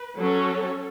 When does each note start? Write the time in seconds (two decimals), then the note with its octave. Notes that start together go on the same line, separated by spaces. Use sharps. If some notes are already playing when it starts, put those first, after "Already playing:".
Already playing: B4
0.19 F#3 C#4 A4